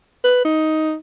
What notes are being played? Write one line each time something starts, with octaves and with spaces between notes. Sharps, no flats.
B4
D#4